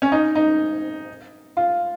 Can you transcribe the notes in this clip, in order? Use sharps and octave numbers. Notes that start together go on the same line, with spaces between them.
C#4
D#4
D#4
F4